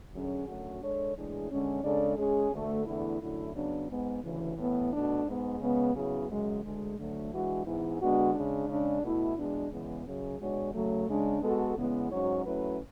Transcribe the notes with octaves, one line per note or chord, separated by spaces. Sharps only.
F#2 D3 F#3 C#4 G#4
F#2 D3 A3 C#4 F#4
G#3 D4 A4 C#5
A2 E3 G#3 D4 G#4
D3 G#3 C#4
C#3 G#3 D4 A4 D5
G#3 C#4 G#4
D2 D3 A3
E2 D3 A3 E4
F#2 D3 A3 E4
C#3 F#3 B3 D4
G#2 G#3 B3
D2 C#3 E3
A2 E3 B3
B2 A3 D4
G#2 G#3 B3
C#3 G#3 B3
C#3 F#3 B3 E4 G#4
F#2 C#3 G#3
D2 D3 G#3
D2 D3 F#3 A3
E3 G#3 D4 F#4
G#2 E3 G#3 B3 E4
D3 G#3 B3 D4 F#4
C#3 G#3 D4
C#3 G#3 D4
B2 A3 E4
E2 B2 G#3 D4
E2 C#3 E3 G#3 B3
F#2 C#3 F#3 C#4 G#4
B2 G#3 D4 F#4 C#5
C#3 F#3 A3
C#3 G#3 D4
G#3 B3 F#4 A4
E2 C#3 G#3 B3 E4
G#2 F#3 C#4 F#4 C#5
F#3 A3 C#4 E4 B4